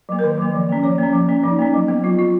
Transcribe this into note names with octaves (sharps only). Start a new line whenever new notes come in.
F#3 A#3
A#4
D#3 B4
F#3 A#3
F3
A#3 C#4
F3 C#5
A#3 C#4
F3
A#3 C#4
F3 D#4
A#3 C#4
F#3
B3
F#3 F4
B3 F4